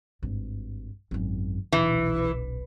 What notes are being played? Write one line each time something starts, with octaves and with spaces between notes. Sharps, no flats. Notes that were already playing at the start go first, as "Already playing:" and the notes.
G#1 G2
G#1 F#2
D#1 B1 E3